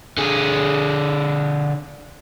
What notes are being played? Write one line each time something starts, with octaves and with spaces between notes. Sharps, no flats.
D3 G#4